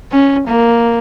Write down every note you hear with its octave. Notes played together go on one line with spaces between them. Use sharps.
C#4
A#3